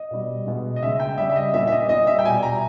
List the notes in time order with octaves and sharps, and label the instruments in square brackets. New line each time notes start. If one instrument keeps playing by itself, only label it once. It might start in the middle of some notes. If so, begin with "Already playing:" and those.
Already playing: [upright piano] D#5
B2 G3
B2 G#3
D#5
C#3 G#3 E5
G5
C#3 G3 E5
E5
D#5
A#2 G3 E5
E5
D#5
A#2 G3 D#5
E5
G5
B2 G3 G#5
A#5